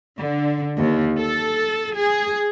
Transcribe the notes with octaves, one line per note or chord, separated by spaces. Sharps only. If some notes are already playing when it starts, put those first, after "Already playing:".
D3
D#2
A4
G#4